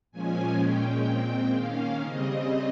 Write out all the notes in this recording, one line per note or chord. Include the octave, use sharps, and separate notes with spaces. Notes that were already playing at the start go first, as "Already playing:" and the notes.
A#2 F3 G#3 C#4 G#5
A#2 G#3 C#4 G5
A#2 G#3 C4
D#3 A#3 C#4 F5
C#3 G3 C4 D#5